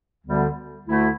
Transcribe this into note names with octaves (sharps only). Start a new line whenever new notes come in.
D2 D3 G3 B3
D2 D3 A3 E4